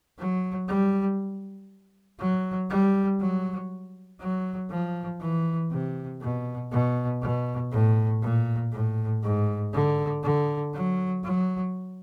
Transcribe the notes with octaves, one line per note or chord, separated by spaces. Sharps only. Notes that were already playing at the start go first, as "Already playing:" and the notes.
F#3
G3
F#3
G3
F#3
F#3
F3
E3
C3
B2
B2
B2
A2
A#2
A2
G#2
D3
D3
F#3
F#3